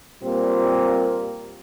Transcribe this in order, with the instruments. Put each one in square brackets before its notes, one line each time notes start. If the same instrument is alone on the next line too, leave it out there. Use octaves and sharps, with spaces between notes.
[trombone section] A#2 G3 A#3 C4